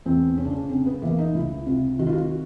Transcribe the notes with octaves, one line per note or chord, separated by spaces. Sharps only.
E2 C4
C#3 C#4
D4
C#4
C#3 C4
B3
E3 A#3
D#4
C#2 E4
C3 F4
D#3 F#4
F4
F#4